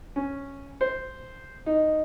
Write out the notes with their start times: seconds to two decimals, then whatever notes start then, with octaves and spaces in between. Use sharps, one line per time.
0.16 C#4
0.81 C5
1.66 D#4